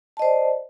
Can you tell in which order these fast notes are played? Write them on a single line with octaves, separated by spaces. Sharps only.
A5 D#5 C5 D5